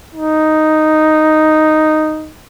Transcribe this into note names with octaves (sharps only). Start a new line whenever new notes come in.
D#4